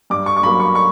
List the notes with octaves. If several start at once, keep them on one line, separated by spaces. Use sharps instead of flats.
G2 D6
C#6
C#6
F#3 A#3 B5
C#6
C#6